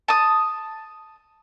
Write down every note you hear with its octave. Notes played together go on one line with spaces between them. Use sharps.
A5 D#6